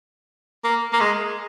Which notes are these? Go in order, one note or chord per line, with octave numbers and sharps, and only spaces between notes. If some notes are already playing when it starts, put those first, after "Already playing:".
A#3
A#3
G#3